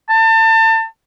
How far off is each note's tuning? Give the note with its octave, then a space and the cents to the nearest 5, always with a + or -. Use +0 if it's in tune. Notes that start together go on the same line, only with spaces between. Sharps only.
A5 +30